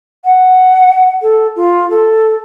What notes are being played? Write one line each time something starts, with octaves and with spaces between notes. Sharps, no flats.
F#5
A4
F4
A4